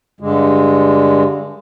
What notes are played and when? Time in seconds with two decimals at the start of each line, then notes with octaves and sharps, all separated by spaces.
0.20 G2 D3 G#3